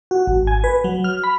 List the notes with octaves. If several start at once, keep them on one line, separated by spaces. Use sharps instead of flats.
F#4
G#1
G#5
B4
F#3
F6
B5